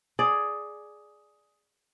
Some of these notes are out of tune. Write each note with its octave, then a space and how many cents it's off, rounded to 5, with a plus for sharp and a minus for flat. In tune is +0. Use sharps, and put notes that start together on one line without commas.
G#4 +10 D5 +5